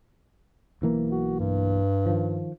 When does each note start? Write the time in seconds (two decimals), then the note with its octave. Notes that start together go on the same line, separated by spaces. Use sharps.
0.82 B1 E3 A#3
1.10 F#4
1.39 G2
2.06 D#3 F3